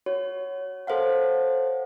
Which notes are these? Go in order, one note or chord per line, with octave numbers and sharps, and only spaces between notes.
F#4 C#5
A4 C5 C#5 F5 F#5